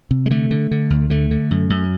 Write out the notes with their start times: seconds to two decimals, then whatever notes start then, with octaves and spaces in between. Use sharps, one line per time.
0.11 C3
0.26 G#3
0.30 D3 A3
0.51 D3
0.71 D3
0.90 D2
1.10 D3 A3
1.31 D3
1.51 F#2
1.70 F#2